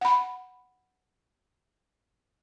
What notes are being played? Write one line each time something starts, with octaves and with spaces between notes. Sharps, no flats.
F#5 B5